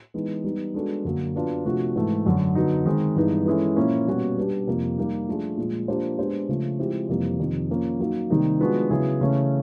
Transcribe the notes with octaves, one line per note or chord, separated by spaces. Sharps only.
E3 G#3 B3 D#4
G3 B3 D#4
G#3 B3 D4 F#4 A4
F#2 D3 F#3 A#3
F#3 B3 D4 F4
C3 F3 A3 D4 F#4
G#2 E3 A3
F#2 D3 F#3
D3 F#3 B3 D#4
D#3 G#3 C4
G2 E3 G#3 B3 D#4
E3 G#3 C#4 E4 A4
A#2 F3 A#3 C#4 E4
B2 G3 A#3 C#4 F#4
G3 B3 D4 G4
F2 C3 F3 A#3
G3 A#3 D#4 G4
F3 A3 D4 F4 G#4
A#2 F3 G#3
F3 A#3 D4 G4 C5
G#3 B3 D4 G4 C5
C#3 F3 A3
F3 G#3 C4 E4 G4
F2 C3 E3 G3 A#3
F2 C3 D#3
F3 A#3 C#4
F#3 A#3 D#4
C3 D#3 G3 A#3 D#4
F3 G#3 B3 D4 F#4
C#3 F#3 B3 E4 G#4
C#3 E3 A3 C#4